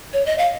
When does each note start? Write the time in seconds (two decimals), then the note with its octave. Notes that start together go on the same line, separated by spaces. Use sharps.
0.13 C#5
0.26 D#5
0.38 F5